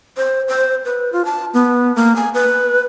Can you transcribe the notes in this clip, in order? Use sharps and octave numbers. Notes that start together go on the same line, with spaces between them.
C5
C5
B4
F4
A5
B3
A#3
G#5
B4